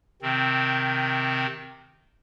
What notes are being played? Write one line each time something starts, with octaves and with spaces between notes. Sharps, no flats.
C3 D#3 C4